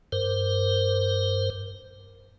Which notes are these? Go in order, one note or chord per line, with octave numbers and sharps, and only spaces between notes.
G2 A#4 C5